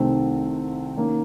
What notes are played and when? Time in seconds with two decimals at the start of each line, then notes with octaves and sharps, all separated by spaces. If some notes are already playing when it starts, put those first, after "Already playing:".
Already playing: C2 C3 D#3 A3 C4
0.97 D#3 A#3 C#4